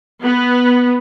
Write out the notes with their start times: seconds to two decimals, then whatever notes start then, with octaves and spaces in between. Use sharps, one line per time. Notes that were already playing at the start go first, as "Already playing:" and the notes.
0.22 B3